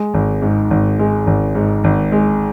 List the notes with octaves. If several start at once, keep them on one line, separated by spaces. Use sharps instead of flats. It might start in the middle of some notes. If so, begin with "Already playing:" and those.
Already playing: G#3
G#1
G#2
G#1
G#3
G#1
G#2
G#1
G#3